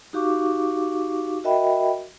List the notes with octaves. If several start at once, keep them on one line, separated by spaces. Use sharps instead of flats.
D#4 F#4 G4 F5 C#6 D6
F#4 A#4 D#5 E5 G5 B5